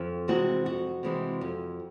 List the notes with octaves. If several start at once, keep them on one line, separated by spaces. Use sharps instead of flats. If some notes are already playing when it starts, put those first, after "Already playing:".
Already playing: F2
C3 E3 G#3 C4 F#4
F2 F#4
C3 E3 G#3 C4
F2